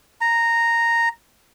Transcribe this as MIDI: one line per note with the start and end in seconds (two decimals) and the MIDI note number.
0.21 1.09 82